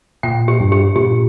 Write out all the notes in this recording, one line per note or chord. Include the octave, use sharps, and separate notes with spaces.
A#2 G5
G4
G2
G4
A#2 G4